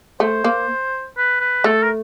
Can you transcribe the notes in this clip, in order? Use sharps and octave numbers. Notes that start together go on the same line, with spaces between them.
A3 C5
A#3
B4
B4
A3 A4
A#4